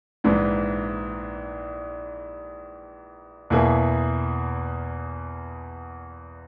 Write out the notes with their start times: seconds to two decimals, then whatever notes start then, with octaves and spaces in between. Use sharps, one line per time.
0.24 A#1 G#2 E3
3.50 E2 B2 A#3 E4 G#4